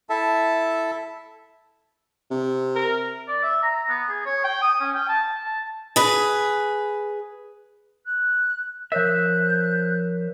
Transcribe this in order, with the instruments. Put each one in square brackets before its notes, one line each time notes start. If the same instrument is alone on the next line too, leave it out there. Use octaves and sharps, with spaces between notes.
[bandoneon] E4 A4 E5 A5
[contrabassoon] C3
[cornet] A#4
[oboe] D5
E5
A#5
B3
G#4
C#5
G5
D#6
C#4
G5
A5
A5
[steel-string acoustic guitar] G#4 B4
[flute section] F#6
[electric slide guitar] F3 E5 [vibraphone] A#4 C#5 [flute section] F#6 G6